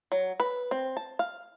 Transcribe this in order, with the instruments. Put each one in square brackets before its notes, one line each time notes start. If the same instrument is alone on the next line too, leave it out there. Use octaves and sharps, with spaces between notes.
[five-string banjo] F#3
B4
C4
A5
F5